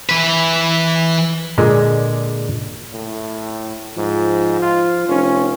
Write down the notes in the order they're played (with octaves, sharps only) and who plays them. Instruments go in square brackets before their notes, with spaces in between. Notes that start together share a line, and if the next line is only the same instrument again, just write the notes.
[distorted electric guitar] E3 B4
[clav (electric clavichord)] A#2 D3 G#3
[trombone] A2
[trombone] G#2 [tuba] F3
[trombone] F4
[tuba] F1 [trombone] C#4